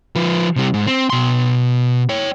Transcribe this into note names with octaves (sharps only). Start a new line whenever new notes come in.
F3 B4
C3 G3
G#2
C4
B2 C6
C#5 G5